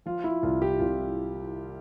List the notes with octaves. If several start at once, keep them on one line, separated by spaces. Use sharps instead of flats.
F3 F4
E4
C2 F4
G4
C2 F4